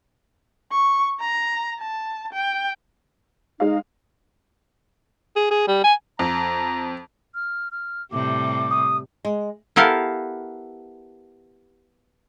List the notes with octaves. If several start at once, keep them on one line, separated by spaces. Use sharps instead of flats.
C#6
A#5
A5
G5
G#3 D#4 F5
G#4
G#4
G3
G#5
F2 A#5
F6
F6
A2 C3 G3 D6
D#6
G#3
B3 E4 G4 A4 A#4 F5